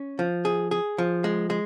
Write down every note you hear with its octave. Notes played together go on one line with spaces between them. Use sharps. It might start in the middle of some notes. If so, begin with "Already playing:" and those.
Already playing: C#4
F3
G#4
G#4
F3
G#3
G#3